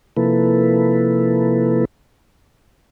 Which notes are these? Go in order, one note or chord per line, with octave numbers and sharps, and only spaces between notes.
C3 F3 A#3 E4 A4 B4